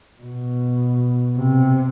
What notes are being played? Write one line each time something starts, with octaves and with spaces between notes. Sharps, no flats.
B2
C3